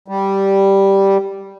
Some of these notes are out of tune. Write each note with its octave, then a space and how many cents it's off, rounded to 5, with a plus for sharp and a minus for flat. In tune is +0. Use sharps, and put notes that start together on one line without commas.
G3 -5